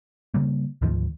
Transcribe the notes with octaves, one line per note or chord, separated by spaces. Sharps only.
C#3 G3 A#3
D2 G#2 D#3 F3